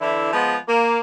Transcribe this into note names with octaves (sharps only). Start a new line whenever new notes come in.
D3 E3 E4
F3 G#3 B3
A#3